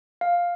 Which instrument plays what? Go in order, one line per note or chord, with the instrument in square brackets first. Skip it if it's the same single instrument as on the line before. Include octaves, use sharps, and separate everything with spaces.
[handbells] F5